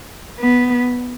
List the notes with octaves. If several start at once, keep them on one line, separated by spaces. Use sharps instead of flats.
B3